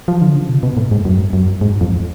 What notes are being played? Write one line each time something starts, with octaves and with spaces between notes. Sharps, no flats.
F3
D3
C#3
B2
B2
A2
G#2
F#2
F#2
G#2
F2